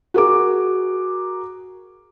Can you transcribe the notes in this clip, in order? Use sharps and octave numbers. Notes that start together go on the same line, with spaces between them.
F#4 G#4 A#4 D6